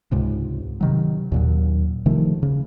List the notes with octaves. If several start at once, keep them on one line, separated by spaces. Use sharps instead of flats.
C#2 G#2 C3
C3 D#3 F#3
D#2 A#2 F#3
C3 D#3 F3 A3
C#3